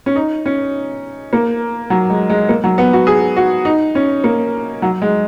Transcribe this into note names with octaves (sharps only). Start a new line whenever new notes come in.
C#4
D#4
C#4
A#3
F#3
G#3
G#3
A#3
F#3
B3
F#4
G#4
F#4
D#4
C#4
A#3
F#3
G#3